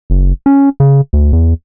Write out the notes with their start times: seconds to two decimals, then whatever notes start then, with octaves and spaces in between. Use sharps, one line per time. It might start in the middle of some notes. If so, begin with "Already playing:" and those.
0.10 F#1
0.46 C#4
0.80 C#3
1.13 D2
1.33 E2